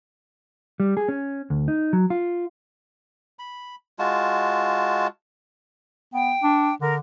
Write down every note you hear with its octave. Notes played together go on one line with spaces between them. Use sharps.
G3
G#4
C#4
D2
D#4
F#3
F4
B5
G#3 F4 F#4 A5
B3 G5
D4
D3 A#4